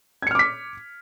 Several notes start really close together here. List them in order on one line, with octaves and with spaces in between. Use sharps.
G#6 C#7 F6 D6 B6